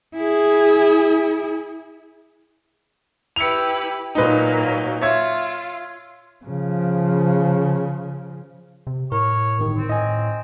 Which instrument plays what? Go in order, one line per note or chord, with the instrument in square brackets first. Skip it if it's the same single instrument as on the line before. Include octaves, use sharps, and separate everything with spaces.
[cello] E4 G#4
[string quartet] E4 G4 B4 [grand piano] C#7 F7
[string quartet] A#2 F#3 A#3 [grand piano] D#4 B4
[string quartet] F4 [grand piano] C#5 E5 G#6
[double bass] C#3 F3
[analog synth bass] C3
[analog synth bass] A2 [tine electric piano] A#4 [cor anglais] C#5
[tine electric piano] G1 D#3
[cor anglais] C4
[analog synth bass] A2 [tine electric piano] D#5 G#5